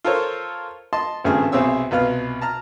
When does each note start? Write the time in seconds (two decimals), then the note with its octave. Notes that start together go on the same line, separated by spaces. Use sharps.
0.04 F4 A4 A#4 C5 C#5
0.93 D#5 A5 C6
1.24 G#1 G2 C#3 A3 G#4 F6
1.52 B1 C3 C4 G#4 C#5 E6
1.91 C2 B2 F4 B4 F5 F6
2.41 A5 A#5 F6